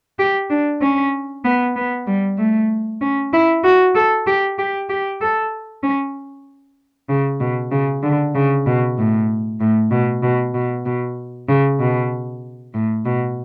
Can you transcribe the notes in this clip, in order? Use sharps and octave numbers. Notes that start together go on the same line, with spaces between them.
G4
D4
C#4
B3
B3
G3
A3
C#4
E4
F#4
A4
G4
G4
G4
A4
C#4
C#3
B2
C#3
D3
C#3
B2
A2
A2
B2
B2
B2
B2
C#3
B2
A2
B2